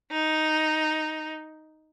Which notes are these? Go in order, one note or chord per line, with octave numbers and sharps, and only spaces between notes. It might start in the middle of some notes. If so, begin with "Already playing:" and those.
D#4